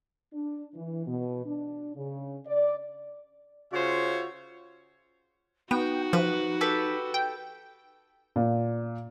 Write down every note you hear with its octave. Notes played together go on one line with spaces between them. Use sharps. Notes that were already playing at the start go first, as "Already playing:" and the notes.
D4
E3
B2
D4
C#3
D5
C#3 F4 F#4 C5 C#5 E5
B3 D#4 F#4 G5
F3 B4
G4 A4 B4
G5
A#2